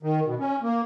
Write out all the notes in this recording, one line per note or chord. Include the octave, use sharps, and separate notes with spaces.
D#3
B2
C#4
A#3